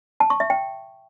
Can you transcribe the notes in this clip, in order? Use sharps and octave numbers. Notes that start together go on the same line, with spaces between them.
A5
C#6
E5
G5